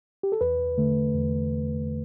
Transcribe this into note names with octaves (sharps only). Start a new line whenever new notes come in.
G4
A4
E2 B4
D3 A3
E2